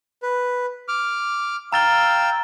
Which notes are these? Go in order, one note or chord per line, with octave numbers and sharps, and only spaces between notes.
B4
D6 F6
F5 G5 A#5 E6 A6 G7